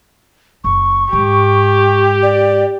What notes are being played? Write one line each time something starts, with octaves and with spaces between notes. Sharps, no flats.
F#1 C#6
G#2 G4
D5